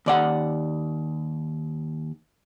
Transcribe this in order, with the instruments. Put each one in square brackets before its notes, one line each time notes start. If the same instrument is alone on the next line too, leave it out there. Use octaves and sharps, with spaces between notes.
[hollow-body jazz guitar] D#2 D5 F#5